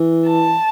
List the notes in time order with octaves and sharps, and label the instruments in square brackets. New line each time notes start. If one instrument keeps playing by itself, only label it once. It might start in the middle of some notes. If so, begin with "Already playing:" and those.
Already playing: [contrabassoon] E3
[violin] A5